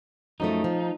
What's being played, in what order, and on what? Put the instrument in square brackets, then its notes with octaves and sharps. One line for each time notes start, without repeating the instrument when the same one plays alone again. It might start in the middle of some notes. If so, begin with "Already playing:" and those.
[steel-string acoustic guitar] F#2 F3 A3 [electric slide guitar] D#4
[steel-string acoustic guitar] F3